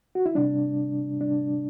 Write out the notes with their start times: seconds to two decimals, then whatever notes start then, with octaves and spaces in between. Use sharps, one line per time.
0.15 F#4
0.26 E4
0.35 C3 G3 D4
1.21 C3 G3 D4